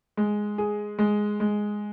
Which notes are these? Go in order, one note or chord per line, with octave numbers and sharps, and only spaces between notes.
G#3
G#4
G#3
G#3